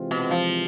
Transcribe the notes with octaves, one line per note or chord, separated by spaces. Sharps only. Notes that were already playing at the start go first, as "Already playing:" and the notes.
Already playing: C3 E3 G#3 C4 F4
B2
F3